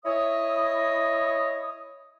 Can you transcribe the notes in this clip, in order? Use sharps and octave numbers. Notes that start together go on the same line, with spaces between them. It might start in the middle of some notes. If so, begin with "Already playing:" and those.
E4 C#5 D#5 D#6